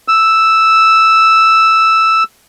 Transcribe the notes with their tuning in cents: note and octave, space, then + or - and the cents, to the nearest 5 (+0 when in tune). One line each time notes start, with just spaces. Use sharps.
E6 +0